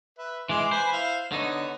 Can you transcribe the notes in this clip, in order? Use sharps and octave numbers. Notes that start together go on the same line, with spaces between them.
B4 E5
E3 G#3 C6 D6
B4 C5 G#5 B5
E4 F5
D3 B3 D#4 C#5